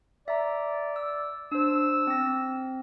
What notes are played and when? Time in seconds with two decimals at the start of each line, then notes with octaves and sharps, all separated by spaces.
0.28 D5 E5 A#5
0.96 E6
1.51 D4 C5 E6
2.07 C4 A#6